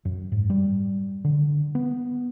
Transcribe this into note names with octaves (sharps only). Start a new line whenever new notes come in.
F#2
G#2
G3
D3
B3